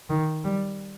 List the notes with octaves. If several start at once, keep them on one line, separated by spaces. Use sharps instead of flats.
D#3
G3